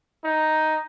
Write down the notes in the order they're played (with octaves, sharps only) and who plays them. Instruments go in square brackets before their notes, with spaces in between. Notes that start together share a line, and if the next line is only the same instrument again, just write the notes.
[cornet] D#4